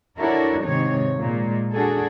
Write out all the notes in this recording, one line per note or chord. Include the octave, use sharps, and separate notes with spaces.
D4 E4 F#4 A4 A#4 C#5
G#2 C3 D#3 C4 D#4 C#5
A#2 G#3
D4 F#4 G#4 A4